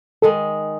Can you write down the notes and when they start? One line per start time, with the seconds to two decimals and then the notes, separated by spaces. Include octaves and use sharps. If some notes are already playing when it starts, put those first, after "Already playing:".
0.22 D#3 G#3 A4